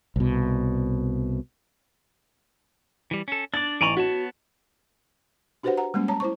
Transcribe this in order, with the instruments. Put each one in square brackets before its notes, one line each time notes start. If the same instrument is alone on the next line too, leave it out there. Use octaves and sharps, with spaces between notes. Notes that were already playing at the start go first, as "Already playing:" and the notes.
[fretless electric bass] C2 B2
[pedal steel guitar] E3 G3
C#4 A4
[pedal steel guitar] D4 D5 [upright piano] A6
[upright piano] A1 C#6 F#7 [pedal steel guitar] D5 G#5 A#5
[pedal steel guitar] B3 C#5 A5 [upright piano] F#4
[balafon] D4 F#4 G4 B4 C5 F#5
F#5 A#5
G3 G#3 A#3 C#4
C#5 A5 A#5
E4 C5 C#6